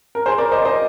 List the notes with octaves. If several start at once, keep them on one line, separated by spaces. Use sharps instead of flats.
A#4
G#4 C5
A#4 D5
C5 D#5
C5 D#5